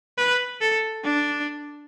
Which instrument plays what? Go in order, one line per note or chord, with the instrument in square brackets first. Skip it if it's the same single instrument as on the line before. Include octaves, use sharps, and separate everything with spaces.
[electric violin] B4
A4
D4